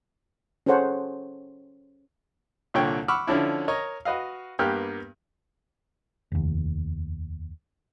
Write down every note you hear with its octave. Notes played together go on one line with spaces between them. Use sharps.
C#4 G#4 A4 C5 C#5 F#5
C2 A#2 D3 C#5 G5
F#5 B5 C#6 D6 E6 F6
D3 F3 C#4 D4 E4
A#4 C#5 D#5
F#4 B4 D#5 F5
G2 A#3 B3 G4 F6 F#6
F1 D#2